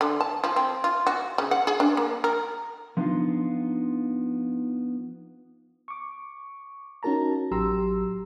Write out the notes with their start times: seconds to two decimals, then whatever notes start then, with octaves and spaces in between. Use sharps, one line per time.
0.01 D3
0.21 A5
0.44 F3
0.56 C4
0.84 F4
1.07 F#4
1.38 C#3
1.51 F#5
1.67 G#4
1.80 D4
1.97 A#3
2.24 A#4
2.97 F3 B3 D4 D#4 F4
5.88 C#6 D6
7.03 C#4 D#4 F#4 A#4 A5 A#5
7.51 A1 F#3 G4 A#5 C6 E6